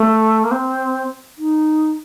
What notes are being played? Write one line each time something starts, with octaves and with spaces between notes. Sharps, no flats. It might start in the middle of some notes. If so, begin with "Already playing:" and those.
Already playing: A3
A#3
C4
D#4